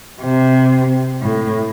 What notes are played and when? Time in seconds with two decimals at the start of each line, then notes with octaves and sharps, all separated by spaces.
0.22 C3
1.22 A2